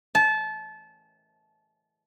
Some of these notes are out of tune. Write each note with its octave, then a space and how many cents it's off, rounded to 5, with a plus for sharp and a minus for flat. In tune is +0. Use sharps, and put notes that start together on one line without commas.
A5 -25